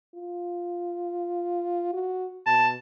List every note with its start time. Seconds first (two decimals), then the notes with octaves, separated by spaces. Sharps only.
0.15 F4
1.93 F#4
2.46 B2 A5